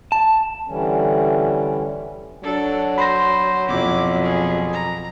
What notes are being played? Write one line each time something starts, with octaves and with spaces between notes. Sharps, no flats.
A5
D3 E3 G3 C#4
F#3 D4 A4
C5 B5 C6 A#6
F2 B2 E4 D6
G#4
A#5